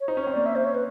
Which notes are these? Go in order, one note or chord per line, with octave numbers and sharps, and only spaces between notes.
C#5
D#4 C5
C#4 C#5
C4
A#3 D5
E5
C5
C#5
B4